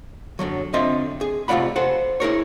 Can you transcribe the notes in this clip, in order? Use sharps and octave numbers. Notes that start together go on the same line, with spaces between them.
F#2 D3 F3 F#3
D3 C4 F4 D#5 E5
G#4
C3 A3 F4 D5 F#5 B5
A4 C5 F#5
E4 G#4 A#4 C#5